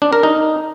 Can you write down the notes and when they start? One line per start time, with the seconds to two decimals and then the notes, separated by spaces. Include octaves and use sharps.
0.02 D4
0.13 A#4
0.23 D#4